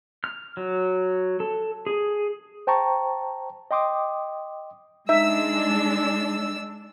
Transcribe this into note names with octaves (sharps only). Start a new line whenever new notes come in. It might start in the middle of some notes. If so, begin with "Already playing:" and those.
F6
F#3
A4
G#4
C5 G5 A5 A#5 C#6
D#5 G5 C6 D6 D#6
G#3 D4 D#4 E5 E6